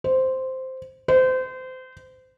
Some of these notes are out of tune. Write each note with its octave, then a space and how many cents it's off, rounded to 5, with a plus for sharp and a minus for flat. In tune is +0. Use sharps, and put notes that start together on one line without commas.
C5 -5
C5 -30